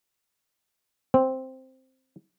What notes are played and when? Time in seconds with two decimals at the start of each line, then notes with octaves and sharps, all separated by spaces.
1.14 C4